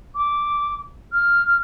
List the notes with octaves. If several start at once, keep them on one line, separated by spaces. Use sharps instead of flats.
D6
F6
F6